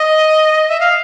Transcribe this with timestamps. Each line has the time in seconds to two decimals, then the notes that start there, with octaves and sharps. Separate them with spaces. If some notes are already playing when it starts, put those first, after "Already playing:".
Already playing: D#5
0.69 E5
0.80 F5